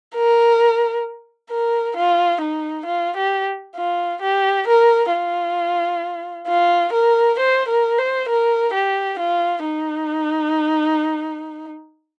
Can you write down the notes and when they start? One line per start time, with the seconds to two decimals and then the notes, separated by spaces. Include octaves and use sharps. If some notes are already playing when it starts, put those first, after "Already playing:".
0.16 A#4
1.51 A#4
1.97 F4
2.41 D#4
2.86 F4
3.17 G4
3.76 F4
4.22 G4
4.68 A#4
5.12 F4
6.48 F4
6.93 A#4
7.39 C5
7.68 A#4
7.99 C5
8.29 A#4
8.74 G4
9.19 F4
9.65 D#4